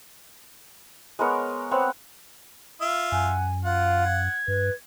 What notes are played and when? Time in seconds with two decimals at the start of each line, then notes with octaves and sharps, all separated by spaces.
1.19 G#3 B3 A#4 C#5
1.71 B3 C4 C#5 F#5
2.81 F4 E5
3.12 F#2 F#5 G#5
3.65 F4 F5 F#5
4.06 G#6
4.48 G2 B4